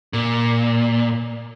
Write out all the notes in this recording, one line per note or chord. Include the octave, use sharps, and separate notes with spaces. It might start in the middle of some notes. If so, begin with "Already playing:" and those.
A#2